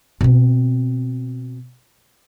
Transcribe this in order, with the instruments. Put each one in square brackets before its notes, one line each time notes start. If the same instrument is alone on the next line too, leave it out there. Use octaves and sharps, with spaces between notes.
[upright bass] B2 C4